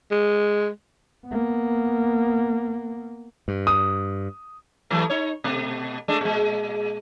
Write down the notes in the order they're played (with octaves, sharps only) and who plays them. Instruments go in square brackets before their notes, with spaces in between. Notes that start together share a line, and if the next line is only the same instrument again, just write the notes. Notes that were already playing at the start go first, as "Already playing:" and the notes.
[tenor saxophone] G#3
[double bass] A#3 B3
[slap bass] G2
[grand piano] D#6
[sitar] E3 F#3 A3
D#4 C#5
B2 A3
G#3 A3 D4
A#2 G#3